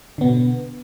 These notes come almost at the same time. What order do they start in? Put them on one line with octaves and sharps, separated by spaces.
D3 B3 B2